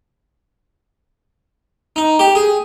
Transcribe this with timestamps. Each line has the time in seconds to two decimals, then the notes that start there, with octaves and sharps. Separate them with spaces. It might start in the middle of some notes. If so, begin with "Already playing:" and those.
1.96 D#4
2.19 G4
2.35 G#4